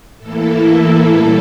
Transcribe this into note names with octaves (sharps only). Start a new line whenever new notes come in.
A2 E3 A#3 E4 A4
A#2 G3 C#4 A4